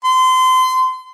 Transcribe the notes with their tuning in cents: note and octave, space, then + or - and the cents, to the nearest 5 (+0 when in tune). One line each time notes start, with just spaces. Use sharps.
C6 -30